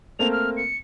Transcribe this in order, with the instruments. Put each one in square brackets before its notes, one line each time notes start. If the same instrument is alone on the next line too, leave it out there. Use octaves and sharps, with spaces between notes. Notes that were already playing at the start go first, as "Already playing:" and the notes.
[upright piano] A3 A#3 C4 [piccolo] F7
[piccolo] F6
C#7